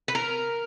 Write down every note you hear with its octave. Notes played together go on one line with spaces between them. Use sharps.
B4
A#4